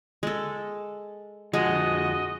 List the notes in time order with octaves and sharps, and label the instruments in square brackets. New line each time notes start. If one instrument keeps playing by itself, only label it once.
[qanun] G#3 A4
[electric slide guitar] F2 D3 F3 [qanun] G#3 [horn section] F#4 [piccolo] D#5